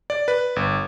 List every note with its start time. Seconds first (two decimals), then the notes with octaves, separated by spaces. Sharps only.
0.10 D5
0.28 B4
0.56 G1